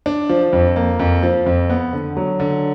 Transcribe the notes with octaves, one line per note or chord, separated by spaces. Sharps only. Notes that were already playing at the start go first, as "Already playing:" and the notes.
D4
F3
F2
A#3
F2
F3
F2
B3
D3
F#3
D3